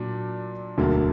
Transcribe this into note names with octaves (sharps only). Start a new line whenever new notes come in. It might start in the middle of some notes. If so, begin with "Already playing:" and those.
Already playing: A#2 F#3 D4
E1 D2 D3 F#3 A#3